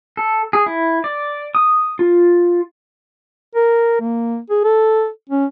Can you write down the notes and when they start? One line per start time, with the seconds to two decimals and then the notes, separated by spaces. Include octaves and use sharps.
0.17 A4
0.53 G#4
0.66 E4
1.04 D5
1.55 D#6
1.99 F4
3.55 A#4
4.01 A#3
4.50 G#4
4.64 A4
5.30 C#4